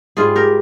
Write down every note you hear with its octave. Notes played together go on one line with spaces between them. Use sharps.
G#2 G3 F4 G#4
G4 A#4